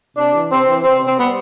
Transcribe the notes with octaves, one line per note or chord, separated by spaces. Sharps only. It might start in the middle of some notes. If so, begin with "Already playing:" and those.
C3 D4
E3
C3 C4
E3
C3 C4
C3 C4
G3 B3